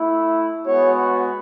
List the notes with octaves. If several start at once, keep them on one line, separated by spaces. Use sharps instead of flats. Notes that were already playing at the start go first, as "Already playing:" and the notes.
Already playing: A3 E4
G#3 B3 F#4 C#5